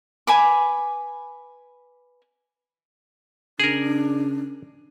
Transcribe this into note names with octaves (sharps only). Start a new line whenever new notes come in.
B4 G#5 B5 D6
C#3 D4 G#4 A#4